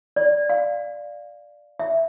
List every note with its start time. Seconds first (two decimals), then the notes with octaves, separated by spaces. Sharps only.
0.16 D5
0.50 F5
1.79 E5